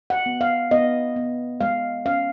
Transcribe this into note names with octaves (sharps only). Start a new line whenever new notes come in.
F#5
B3
F5
B3 D#5
B3
G#3 F5
C#4 F5